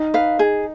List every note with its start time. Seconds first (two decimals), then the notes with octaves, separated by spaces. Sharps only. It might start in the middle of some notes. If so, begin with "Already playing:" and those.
Already playing: D#4
0.14 B4 F5
0.39 G#4